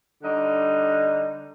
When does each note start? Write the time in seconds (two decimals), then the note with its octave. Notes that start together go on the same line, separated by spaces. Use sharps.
0.23 D3 G3 D#4